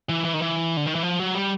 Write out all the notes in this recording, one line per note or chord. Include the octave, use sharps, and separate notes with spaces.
E3
E3
D#3
E3
D3
D#3
E3
F3
F#3
G3